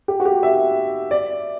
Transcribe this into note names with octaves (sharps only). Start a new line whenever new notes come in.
G4
F#4
G4
E5
D5